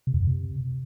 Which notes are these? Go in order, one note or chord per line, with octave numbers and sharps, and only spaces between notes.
C3
E2
F2
C3